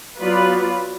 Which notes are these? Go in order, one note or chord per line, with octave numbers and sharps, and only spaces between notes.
F#3 B3 F4 B4 D5